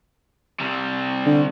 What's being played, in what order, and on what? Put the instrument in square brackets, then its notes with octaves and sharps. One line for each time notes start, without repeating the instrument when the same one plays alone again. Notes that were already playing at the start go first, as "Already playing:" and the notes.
[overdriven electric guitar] C3 G3
[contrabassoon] D3